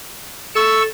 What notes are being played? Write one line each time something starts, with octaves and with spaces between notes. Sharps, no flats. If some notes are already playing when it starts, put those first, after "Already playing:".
A4 C#6 E6